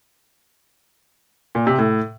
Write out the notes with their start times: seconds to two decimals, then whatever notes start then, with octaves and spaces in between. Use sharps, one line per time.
1.55 A#2
1.67 C3
1.78 A2